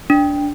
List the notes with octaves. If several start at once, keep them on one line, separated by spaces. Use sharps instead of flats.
D4